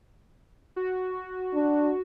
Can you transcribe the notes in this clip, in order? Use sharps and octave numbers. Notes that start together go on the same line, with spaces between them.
F#4
D4